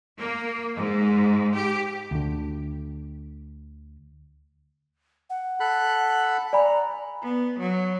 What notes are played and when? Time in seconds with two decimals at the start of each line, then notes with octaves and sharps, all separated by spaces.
0.18 A#3
0.76 G#2
1.55 G4
2.11 D2 D3
5.30 F#5
5.60 A4 B5 F#6
6.53 D5 G#5 A#5 B5
7.22 B3
7.59 F#3